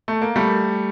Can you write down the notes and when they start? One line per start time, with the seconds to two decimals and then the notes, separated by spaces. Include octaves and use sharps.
0.08 A3
0.22 A#3
0.36 G3 A3